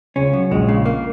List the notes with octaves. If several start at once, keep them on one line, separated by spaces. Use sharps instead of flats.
C#2 C#3 C#4
F#2
A#1 A#2 G#3
C#3
A#3